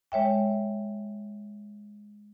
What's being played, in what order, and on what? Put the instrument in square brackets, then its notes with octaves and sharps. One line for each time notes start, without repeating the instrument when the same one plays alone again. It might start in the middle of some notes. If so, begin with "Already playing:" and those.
[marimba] G#3 C#5 E5 G5